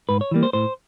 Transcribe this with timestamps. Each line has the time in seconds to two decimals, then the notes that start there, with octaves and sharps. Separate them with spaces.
0.09 G#2 B4
0.21 C#5
0.31 E3 G3 A#3
0.43 C5
0.53 A2 C5